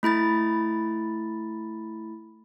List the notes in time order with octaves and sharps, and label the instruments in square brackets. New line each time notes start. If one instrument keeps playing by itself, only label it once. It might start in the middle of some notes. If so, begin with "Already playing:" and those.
[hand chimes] A3 E4 B5 A6